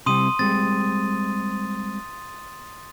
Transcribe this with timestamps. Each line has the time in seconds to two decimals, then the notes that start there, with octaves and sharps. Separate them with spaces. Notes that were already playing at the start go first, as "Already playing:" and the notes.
0.06 C3 G3 C4 C6 D#6 D#7
0.39 G3 G#3 C4 A6